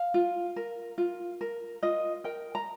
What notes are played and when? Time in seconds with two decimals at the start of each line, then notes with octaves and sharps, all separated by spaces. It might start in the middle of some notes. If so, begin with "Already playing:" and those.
Already playing: F5
0.14 F4
0.56 A#4
0.98 F4
1.41 A#4
1.83 F4 D#5
2.24 A#4 G5
2.55 A#5